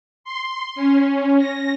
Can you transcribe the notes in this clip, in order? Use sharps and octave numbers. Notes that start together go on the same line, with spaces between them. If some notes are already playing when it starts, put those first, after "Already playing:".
C6
C#4
A#6